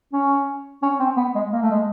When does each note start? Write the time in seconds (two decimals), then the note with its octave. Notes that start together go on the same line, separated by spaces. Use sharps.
0.13 C#4
0.82 C#4
1.00 C4
1.17 B3
1.35 G#3
1.52 A#3
1.62 A3
1.71 G#3